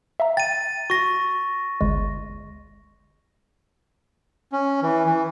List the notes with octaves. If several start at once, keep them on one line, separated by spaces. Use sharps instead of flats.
E5 F5 A#5
G5 A6 D#7
F#4 C#6 A#6
G1 C#2 G#3
C#4
E3
E3